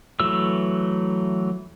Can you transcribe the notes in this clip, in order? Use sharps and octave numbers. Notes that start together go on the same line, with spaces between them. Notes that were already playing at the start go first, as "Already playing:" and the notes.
E3 F#3 A3 E6